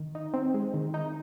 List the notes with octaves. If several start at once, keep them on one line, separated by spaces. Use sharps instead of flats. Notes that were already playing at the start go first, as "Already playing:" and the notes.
Already playing: D#3
D#4
C4
G#3
D#3
D#4